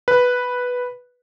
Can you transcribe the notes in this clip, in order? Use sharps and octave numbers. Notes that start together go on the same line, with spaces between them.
B4